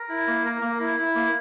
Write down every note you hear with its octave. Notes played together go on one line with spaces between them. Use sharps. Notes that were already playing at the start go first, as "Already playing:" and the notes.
Already playing: A#4
E4
A#3
A#4
A#3
E4
E4
A#3